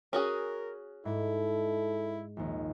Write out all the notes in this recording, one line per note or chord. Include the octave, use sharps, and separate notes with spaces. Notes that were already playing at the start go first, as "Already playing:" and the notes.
C#4 F#4 G#4 A#4
G#2 E4 A4
A#1 D#2